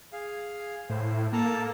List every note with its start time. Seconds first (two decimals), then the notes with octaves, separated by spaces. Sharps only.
0.13 G#4 F5
0.90 A2 C5
1.33 A#3 A4 A5 A#5